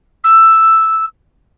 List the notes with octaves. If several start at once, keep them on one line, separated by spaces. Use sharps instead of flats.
E6